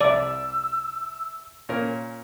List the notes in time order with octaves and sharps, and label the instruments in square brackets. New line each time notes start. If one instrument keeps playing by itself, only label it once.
[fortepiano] C2 E5 [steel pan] D5 [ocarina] E6
[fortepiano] A#2 C#4 A#4